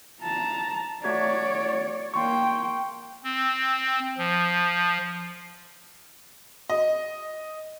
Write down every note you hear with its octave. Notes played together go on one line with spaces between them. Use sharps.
A5 A#5
A3 F#4 C#5 D5 G#6
A#3 G5 C6 C#6
C4
F3
D#5